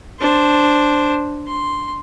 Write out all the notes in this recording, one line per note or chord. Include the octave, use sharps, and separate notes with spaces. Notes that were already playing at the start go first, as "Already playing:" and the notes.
D4 C5
C6